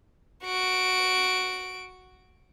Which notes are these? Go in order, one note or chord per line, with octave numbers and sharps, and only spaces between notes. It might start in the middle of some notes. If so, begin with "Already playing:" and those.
F#4 D7